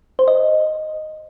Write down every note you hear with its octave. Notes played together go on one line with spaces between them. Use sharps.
C5
D#5